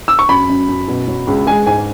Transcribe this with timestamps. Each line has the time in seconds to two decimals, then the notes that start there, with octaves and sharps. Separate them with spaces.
0.08 E6
0.19 C#6
0.29 F#2 B5
0.49 F#2
0.69 F#2
0.88 B2
1.08 F#3
1.27 C#2
1.47 G#3 G#5
1.66 G#2 G#5